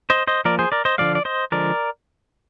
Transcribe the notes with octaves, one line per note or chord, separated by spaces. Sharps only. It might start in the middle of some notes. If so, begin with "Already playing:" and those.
C5 D#5
C5 D#5
F3 A#3 A#4 D5
G#4 C5
A#4 D5
C5 D#5
D3 F3 G#3 D5 F5
D5
C5 D#5
D3 F3 G#3 A#4 D5